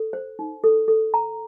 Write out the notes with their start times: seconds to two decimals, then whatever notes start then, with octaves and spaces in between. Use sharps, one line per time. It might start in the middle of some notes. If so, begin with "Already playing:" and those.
Already playing: A4
0.13 C5
0.39 D#4
0.64 A4
0.88 A4
1.14 A#5